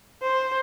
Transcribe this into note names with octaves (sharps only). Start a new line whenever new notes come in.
C5